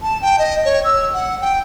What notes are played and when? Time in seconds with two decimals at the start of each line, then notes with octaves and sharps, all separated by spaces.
0.02 A5
0.22 G5
0.39 D#5
0.65 C#5
0.84 E6
1.14 F#5
1.41 G5